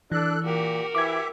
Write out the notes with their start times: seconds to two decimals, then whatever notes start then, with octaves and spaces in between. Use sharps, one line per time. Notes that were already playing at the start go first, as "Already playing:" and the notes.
0.12 E3 D4 A4 F#6
0.44 A#2 F#4 G4 A#4
0.95 E3 G4 E5 D6 G#6